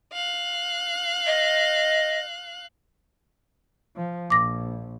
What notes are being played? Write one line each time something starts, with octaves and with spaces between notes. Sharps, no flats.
F5 F#6
D#5
F3
A#1 D6 A#6